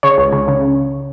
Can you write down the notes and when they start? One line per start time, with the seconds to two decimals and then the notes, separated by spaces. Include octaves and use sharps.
0.03 C#3 C#5
0.18 C#2
0.33 C#3
0.48 C#3